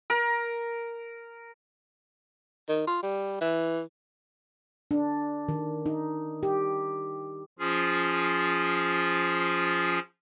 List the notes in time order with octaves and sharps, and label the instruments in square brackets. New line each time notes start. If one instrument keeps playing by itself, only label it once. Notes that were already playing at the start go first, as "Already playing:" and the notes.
[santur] A#4
[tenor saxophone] D#3
F4
G3
E3
[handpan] D4
D#3
D#4
G4
[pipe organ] F3 C#4 F4 G#4